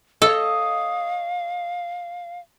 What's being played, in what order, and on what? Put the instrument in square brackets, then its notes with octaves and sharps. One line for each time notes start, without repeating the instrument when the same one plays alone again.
[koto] A4 [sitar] C#5 D#5 [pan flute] F5